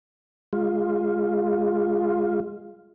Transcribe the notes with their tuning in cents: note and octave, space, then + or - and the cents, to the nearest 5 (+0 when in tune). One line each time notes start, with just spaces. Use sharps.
G#3 +0 F4 +0